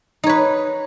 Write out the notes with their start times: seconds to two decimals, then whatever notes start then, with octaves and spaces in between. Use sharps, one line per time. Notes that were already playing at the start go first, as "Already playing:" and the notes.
0.24 D#4
0.26 C#5
0.29 B4